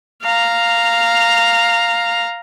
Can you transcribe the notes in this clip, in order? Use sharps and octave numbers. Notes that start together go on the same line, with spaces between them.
F5 A#5